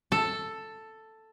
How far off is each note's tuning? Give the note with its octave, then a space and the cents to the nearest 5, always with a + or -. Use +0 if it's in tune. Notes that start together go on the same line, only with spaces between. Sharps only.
A4 +5